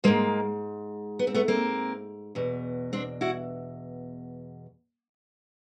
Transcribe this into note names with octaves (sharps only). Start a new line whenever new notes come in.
G#2 F3 G#3 A#3
B3
C4
A3 B3
A#3 C4
E2 B2
C4 D4
E4 F#4